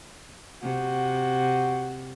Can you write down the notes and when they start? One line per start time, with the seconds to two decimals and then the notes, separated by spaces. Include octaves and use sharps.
0.63 C3 F#4